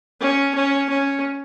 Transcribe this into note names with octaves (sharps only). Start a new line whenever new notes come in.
C#4
C#4
C#4